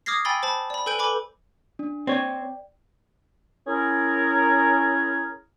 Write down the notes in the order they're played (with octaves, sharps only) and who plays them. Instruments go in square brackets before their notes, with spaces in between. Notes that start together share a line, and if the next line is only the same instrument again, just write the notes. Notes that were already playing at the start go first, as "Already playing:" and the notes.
[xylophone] D6 D#6 F6 G#6 A#6 C7
G5 G#5 B5 E6 A6 G7
C5 A5 B5
D5 B5
A4 B4 G#5 G6 D7 F#7
A4 B4 G#5 B5 D6 F#7
[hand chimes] D4
[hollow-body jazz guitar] C4 C#5 [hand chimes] D5 G5
[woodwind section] C#4 E4 G#4 A#4